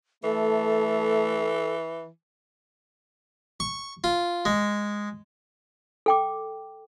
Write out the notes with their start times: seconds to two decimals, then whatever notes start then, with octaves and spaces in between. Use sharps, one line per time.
0.24 E3 A3 A4
3.60 C#6
4.04 F4
4.45 G#3
6.06 A4 G5 D6